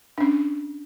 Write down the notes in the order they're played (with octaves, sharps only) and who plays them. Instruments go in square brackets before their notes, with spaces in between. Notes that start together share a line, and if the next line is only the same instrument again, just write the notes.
[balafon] C#4 D4